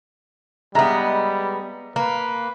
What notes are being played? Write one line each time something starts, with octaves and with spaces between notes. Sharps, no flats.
G3 G#3 B3 E5 A#5 A#6
A#3 B4